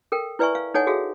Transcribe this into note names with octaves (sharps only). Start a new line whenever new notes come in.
A4 A#4 G5
E4 B4 D5 E5 G#5 C#6
F5
D#4 A4 C#5 D#5 F#5 G#5
F#4 G#4 A4 E5 F5